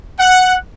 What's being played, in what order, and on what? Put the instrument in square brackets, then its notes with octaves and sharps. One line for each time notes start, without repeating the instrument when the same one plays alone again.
[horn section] F#5